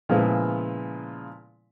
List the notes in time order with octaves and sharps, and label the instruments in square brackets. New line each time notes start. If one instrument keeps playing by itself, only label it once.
[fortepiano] A#2 C#3 F3 G#3 B3 E4